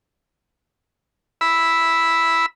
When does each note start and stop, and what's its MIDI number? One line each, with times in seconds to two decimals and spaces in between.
1.41 2.46 83
1.41 2.46 88